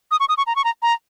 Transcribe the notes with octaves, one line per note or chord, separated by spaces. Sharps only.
D#6
C#6
D#6
C#6
A#5
C#6
A#5
A#5